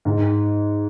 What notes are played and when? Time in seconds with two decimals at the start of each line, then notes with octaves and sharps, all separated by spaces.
0.05 G#2